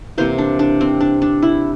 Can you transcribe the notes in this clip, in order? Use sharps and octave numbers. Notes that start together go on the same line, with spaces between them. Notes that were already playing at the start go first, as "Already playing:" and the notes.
C3 E3 A#3 C5
D4
D4
C4
D4
D4
E4